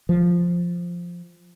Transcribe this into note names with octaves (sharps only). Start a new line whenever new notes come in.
F3